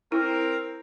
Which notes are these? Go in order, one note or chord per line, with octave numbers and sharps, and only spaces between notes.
C4 E4 A#4